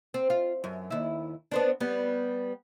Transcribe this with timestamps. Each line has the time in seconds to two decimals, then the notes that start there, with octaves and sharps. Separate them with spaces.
0.14 C4
0.30 F4
0.64 F#2
0.91 D#2 E4
1.51 B3 C4 D4
1.80 G3 B3